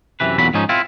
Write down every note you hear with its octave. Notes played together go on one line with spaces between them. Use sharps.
F#2 C3 E3 B4
B1 E2 A#2 F#3 B5
G#2 F3 C#4 D#4
C4 E4 F4